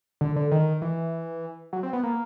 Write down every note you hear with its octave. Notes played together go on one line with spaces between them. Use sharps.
D3
D3
D#3
E3
F#3
C4
B3
A#3